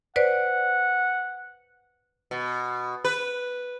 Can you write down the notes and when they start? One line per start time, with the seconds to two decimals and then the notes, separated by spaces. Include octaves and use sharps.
0.16 B4 C5 D5 F#5
2.31 B2
3.05 B4